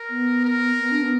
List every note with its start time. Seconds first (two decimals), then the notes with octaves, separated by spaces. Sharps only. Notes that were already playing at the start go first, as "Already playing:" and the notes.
Already playing: A#4
0.10 B3
0.45 A#4
0.79 B3
0.91 D4
1.02 B3